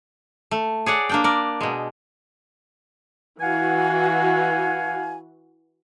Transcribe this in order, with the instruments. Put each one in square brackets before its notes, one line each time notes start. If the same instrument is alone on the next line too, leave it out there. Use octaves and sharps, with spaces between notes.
[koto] A3
G#4 C#5 D5 F#5
A#3 D4 G5
A#4 D5
B2 G#3
[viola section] E3 F#4 [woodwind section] F5 F#5 G#5